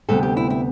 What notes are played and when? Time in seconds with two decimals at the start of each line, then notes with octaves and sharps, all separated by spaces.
0.09 D2 C3 G3 B3 A4
0.23 G4
0.37 E4
0.50 E4